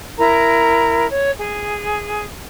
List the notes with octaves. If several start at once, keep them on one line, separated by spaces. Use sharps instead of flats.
E4 A#4 A#5
C#5
G#4